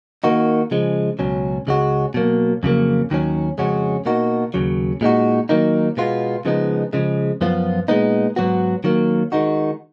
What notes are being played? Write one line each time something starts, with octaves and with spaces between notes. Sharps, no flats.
D#3 A#3 D#4 F#4
C#3 F3 G#3
C#2 B2 F#3 C#4
C#2 C#3 G#3 C#4 F#4
B2 F#3 A#3
F2 C#3 F#3 A#3
D#2 D#3 F#3 C#4
F2 C#3 G#3 C#4 F#4
B2 A#3 D#4 F#4
D#2 C#3 F#3
A#2 G#3 D#4 F#4
D#3 F#3 A#3 D#4
B2 G#3 B3 F4
C#3 F3 G#3 B3 D#4
C#3 F3 G#3
F#2 F3 B3 F4
A#2 G#3 B3 D#4
G#2 F#3 B3 F#4
D#3 F#3 A#3
D#3 G#3 D#4 F#4